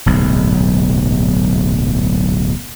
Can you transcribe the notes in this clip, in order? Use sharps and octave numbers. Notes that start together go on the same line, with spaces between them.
D1 B1 G#2